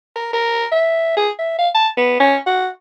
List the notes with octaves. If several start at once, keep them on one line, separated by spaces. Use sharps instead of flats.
A#4
A#4
E5
G#4
E5
F5
A5
B3
C#4
F#4